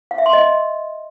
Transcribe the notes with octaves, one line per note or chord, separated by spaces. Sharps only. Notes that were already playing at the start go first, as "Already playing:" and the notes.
F5
E5
C6
D#5